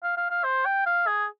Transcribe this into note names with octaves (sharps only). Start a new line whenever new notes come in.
F5
F5
F5
C5
G5
F5
G#4